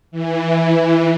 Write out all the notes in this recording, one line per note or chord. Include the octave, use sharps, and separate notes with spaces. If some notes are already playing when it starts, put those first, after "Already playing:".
E3